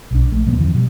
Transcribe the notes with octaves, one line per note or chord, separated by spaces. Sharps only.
B1 D4
A#1 A3
D1 A#2 F#3 B3
G1 F2 D3 E3
B2 F#3 G3